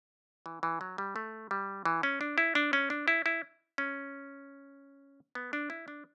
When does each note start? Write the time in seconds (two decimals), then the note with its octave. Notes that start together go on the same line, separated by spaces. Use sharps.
0.46 E3
0.63 E3
0.81 F#3
0.98 G3
1.16 A3
1.51 G3
1.85 E3
2.03 C#4
2.21 D4
2.38 E4
2.55 D4
2.73 C#4
2.90 D4
3.08 E4
3.26 E4
3.78 C#4
5.35 B3
5.53 D4
5.70 E4
5.88 D4